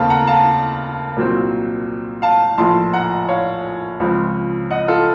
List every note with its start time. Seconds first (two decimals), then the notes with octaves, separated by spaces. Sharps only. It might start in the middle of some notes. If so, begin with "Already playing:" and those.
Already playing: D#2 C#3 A3 C4 F5 A5
0.10 F#5 A#5
0.27 F5 A5
1.17 C2 A#2 F#3 C4
2.22 F5 A5
2.58 A#1 A2 F3 A5 C6
2.93 F#5 A#5
3.29 C#5 F5
4.00 C#2 C#3 F3 C4
4.71 D#5 F#5
4.88 F4 A4